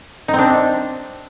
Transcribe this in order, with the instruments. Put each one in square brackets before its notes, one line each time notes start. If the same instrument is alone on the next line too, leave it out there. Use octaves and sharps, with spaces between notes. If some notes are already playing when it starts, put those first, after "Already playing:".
[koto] D#4
C4
D4